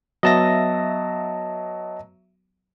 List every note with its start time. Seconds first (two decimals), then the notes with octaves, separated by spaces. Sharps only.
0.23 F#3 B3 D#5 E5 A5 A#6